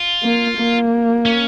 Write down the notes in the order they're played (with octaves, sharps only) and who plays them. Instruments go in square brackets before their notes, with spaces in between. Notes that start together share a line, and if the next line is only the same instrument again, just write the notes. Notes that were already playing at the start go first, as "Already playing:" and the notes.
Already playing: [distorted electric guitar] F4
[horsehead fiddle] A#3
A#3
[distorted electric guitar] C#4